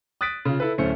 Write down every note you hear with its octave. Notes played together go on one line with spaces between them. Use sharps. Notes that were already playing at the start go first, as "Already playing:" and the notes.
D#6 F#6 A6 B6 D7
C#3 F4
E4 A4 B4
D1 A3 C#4 C5 E5 C#7